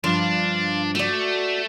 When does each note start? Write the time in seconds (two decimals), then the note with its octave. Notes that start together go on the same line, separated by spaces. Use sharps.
0.04 G2 F3 D4 F4
0.95 A3 F#4 D5